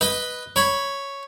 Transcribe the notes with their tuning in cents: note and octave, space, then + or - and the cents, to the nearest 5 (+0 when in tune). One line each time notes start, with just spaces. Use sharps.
B4 +0 D#5 +0
C#5 +0 B5 +0